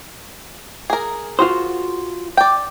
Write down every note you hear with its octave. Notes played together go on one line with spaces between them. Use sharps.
G#4 A#4
F4 F#4 C5
D5 G5